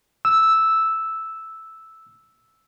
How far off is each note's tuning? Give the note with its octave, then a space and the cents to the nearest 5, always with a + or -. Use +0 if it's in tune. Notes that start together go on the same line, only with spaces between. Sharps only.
E6 -5